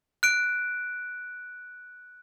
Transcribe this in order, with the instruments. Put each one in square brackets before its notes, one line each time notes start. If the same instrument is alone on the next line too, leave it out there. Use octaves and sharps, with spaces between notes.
[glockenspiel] F#6 D7